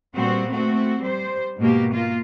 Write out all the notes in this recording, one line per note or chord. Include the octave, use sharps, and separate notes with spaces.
A#2 G3 B3 C4 F#4
A3 C4 F#4
G3 C5
G#2 B2 A#3 G4
A#3 F4